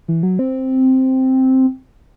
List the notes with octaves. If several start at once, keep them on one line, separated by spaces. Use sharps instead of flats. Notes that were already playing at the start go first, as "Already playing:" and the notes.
E3
F#3
C4